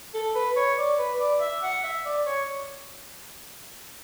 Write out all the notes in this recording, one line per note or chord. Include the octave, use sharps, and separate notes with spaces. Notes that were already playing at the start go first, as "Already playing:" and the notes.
A4
B4
C#5
D5
B4
D5
E5
F#5
E5
D5
C#5